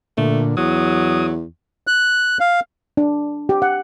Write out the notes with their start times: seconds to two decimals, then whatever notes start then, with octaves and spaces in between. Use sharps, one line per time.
0.17 A#2 D3 A3
0.57 E2 F#3 D#6
1.87 F#6
2.40 F5
2.97 D4
3.49 G4
3.62 F#5